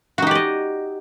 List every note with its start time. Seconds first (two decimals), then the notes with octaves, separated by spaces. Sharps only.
0.18 F#4
0.22 D#4
0.27 G4
0.31 D5
0.35 D#5